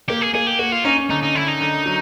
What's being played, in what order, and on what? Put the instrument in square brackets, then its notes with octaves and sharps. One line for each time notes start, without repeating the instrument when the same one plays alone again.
[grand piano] A#3 [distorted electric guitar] G4
[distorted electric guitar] G#4
[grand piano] A#3 [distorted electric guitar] G#4
[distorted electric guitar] G4
[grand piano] A#3 [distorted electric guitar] F#4
[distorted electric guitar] F4
[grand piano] C#4 [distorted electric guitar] D#4
[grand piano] D3 [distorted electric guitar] D#4
[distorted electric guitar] D#4
[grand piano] D3 [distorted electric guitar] E4
[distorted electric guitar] D#4
[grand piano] D3
F#3